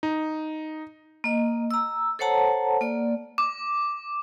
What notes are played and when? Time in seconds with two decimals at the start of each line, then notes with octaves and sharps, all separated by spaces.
0.03 D#4
1.24 A#3 D#5
1.71 A#5 E6
2.19 A4 C5 C#5 F#5 A5 A#5
2.81 A#3 D5
3.38 D6